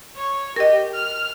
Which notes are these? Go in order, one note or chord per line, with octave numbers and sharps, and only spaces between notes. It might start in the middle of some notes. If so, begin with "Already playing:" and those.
C#5
G4 A#4 D#5
F6